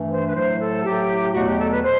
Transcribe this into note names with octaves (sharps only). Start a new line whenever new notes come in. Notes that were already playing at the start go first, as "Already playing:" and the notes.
Already playing: G2 E3 A3
C5
B4
A2 F#3 A3 C5
A4
A2 F#3 A3 G4
E2 B2 F#3 A3 F#4
G4
A4
B4
B2 C5